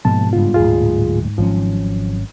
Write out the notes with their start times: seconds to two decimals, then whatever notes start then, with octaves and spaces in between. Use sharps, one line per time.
0.05 G#2 B2 F3 A#3 A5
0.33 G2 C#3 B3 F4
0.54 D1 G#1 A#2 F4 G#4
1.38 G#1 F3 F#3 C#4